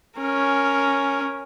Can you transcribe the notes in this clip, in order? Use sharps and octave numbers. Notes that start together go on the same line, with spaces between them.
C#4 A#4